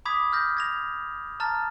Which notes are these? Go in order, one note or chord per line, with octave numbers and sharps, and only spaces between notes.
B5 D6 D#6 G#6 B6
F6 G6 A#6
G#6 A#6 F7
A5 A#5 F6 A6